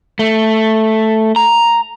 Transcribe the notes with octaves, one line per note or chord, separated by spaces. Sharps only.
A3
A#5